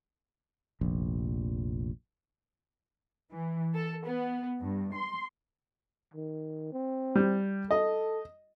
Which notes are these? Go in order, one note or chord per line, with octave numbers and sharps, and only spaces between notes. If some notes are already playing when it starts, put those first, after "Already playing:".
F1 A#1
E3
A4
B3
G2
C6
D#3
C4
G3
A4 D#5